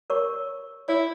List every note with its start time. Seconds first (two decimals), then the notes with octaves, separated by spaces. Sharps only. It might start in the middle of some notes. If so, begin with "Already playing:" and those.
0.10 A#4 C#5 C#6
0.89 E4 C#5